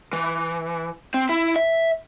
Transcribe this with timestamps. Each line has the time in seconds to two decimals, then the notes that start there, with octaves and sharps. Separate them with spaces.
0.13 E3
1.14 C4
1.29 E4
1.56 E5